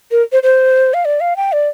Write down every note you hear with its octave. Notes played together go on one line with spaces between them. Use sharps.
A#4
C5
C5
F5
D5
F5
G5
D5